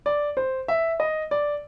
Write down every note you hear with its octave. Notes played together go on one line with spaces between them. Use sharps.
D5
C5
E5
D#5
D5